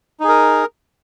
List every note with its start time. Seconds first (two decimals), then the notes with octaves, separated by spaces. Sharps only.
0.20 D#4
0.24 G#4
0.28 A#4